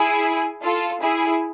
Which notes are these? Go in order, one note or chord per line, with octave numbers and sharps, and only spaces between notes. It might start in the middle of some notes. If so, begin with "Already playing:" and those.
Already playing: E4 G#4
F4 A4
E4 G#4